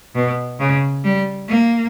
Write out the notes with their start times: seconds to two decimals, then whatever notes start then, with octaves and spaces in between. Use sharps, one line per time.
0.15 B2
0.60 C#3
1.04 G3
1.49 A#3